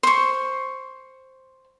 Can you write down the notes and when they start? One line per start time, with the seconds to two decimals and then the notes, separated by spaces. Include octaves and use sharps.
0.03 C5 C#6